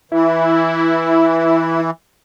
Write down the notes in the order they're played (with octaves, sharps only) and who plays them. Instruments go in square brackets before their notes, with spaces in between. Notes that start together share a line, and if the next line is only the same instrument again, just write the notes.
[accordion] E3 [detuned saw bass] E4